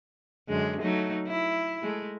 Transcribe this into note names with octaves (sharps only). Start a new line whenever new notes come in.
F#2 D3 G#3
F#3 A3 D#4
E4
G#3 A3